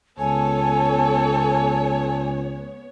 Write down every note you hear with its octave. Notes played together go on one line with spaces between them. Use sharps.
C#2 B3 A4 C#5 G#5